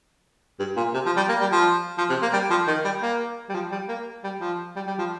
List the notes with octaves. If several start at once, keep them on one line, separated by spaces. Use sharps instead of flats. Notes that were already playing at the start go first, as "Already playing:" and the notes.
G2
A#2
C3
F3
G3
A#3
G3
F3
F3
C3
A#3
G3
F3
D#3
G3
A#3
G3
F3
G3
A#3
G3
F3
G3
G3
F3